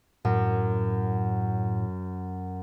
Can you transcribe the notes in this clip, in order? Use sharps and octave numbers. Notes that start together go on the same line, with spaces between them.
F#2 A2